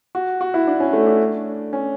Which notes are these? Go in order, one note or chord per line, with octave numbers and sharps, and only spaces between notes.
F#4
F#4
E4
D4
C#4
A3
D4
C#4